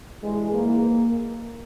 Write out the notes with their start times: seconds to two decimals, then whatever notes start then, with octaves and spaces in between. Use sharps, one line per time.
0.21 G2 E3 G#3
0.52 G#2 E3 A#3